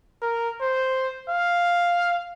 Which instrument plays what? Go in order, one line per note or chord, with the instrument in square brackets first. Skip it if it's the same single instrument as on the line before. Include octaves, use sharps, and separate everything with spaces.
[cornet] A#4
C5
F5